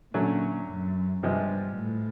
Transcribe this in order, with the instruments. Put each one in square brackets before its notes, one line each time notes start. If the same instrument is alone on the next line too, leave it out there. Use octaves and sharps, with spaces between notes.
[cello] A#2 [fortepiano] D3 F#3 A3 C#4
[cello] F#2
[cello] G2 [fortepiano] C3 F3 G#3 B3
[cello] A2